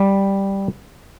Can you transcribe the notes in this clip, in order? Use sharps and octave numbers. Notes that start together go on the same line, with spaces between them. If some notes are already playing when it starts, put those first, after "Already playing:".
Already playing: G3